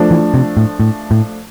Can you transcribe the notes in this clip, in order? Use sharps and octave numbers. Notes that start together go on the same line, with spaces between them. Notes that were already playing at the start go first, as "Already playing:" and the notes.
Already playing: F3 A3 D4
E3
C3
A2
A2
A2